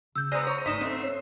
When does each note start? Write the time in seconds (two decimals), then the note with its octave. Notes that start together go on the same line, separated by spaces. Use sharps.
0.16 C#3 E6 G6
0.32 G#3 B3 F4 C5 D5 A#5 D#6
0.47 C#5
0.66 E2 G#2 A3 D#4 D#5 B6 E7
0.81 G#2 A3 C4 C#4 C6 E6
1.03 C#5